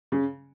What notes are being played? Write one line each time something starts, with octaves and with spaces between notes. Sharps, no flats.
C#3